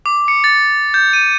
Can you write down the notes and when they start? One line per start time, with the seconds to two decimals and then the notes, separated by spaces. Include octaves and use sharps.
0.06 D6
0.28 C#7
0.44 A6
0.94 G6
1.13 D#7